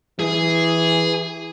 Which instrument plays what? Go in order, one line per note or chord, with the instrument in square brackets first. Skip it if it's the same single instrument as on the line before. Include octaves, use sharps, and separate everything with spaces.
[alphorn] E3 [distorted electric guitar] G#4